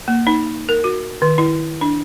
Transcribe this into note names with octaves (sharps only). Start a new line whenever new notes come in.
A#3
D#4
A#4
F#4
D#3
E4
D4